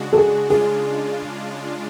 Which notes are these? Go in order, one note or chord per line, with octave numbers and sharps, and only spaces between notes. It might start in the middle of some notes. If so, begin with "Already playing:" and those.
Already playing: C#3 G#3 D4 F#4
A4
G#4
C#3 G#3 D4 F4 G#4